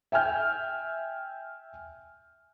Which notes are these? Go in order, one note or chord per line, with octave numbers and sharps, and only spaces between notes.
E5 G5 G#5 F6 G6